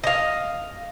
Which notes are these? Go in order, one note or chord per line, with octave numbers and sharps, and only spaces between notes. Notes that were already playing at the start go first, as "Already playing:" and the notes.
D#5 F5